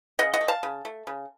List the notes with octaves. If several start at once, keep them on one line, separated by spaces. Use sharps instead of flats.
C#3 D#5 F#5
D#5 F#5
A3
F5 A5
C#3
A3
C#3